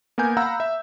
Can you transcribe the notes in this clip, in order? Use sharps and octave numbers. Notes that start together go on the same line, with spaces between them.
A#3 B3 A#4 G#5 G6
F5 F#5 A#5 B5 E6
E5